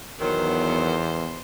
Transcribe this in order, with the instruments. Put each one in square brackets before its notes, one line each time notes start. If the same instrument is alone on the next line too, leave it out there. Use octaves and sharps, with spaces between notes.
[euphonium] E2 [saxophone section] D#3 F#3 [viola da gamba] B3 C5 [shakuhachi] A#4